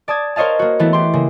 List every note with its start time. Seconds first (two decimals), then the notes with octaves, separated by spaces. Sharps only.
0.08 D5 A5 D#6 G#6
0.36 A#4 C5 C#5 D#5 F5 A5
0.59 A#3 F#4
0.79 E3 A3 B3 E4
0.93 G4 C6
1.13 C#3 A#3